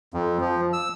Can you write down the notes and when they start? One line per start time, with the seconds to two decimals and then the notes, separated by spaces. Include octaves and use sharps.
0.14 F2
0.41 F3
0.73 E6